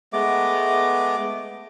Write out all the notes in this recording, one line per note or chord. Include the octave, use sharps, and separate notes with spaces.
G#3 A3 B3 D6